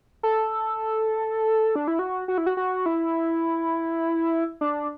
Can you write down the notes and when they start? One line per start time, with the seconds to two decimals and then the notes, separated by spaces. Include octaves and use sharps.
0.23 A4
1.76 D4
1.88 E4
1.99 F#4
2.28 F#4
2.38 E4
2.46 F#4
2.57 F#4
2.86 E4
4.61 D4